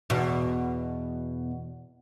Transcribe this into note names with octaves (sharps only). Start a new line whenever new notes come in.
E2 B2